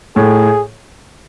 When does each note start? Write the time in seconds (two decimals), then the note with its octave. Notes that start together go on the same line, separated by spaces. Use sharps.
0.16 A2 G#4